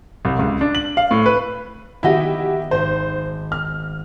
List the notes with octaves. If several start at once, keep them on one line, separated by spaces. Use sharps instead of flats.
C2
C#2
D4
F#7
F5
A2
B4
D#3 B3 E4 F#4 G4 D#5
G#1 C5
F6